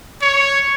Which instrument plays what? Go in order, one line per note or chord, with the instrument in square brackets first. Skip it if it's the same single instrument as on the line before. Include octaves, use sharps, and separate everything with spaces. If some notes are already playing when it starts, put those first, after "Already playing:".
[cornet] C#5